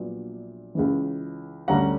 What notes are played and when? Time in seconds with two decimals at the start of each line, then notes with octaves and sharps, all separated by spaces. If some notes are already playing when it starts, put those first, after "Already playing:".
Already playing: A#1 A#2 F#3 B3 D4
0.75 C#2 C#3 E3
1.68 D2 D3 G3 C#4 F#5 A#5